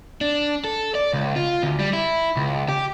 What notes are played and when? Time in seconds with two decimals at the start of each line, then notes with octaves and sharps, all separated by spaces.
0.21 D4
0.64 A4
0.95 D5
1.13 C#2
1.36 F4
1.63 D2
1.79 G3
1.93 E4
2.37 C#2
2.69 G4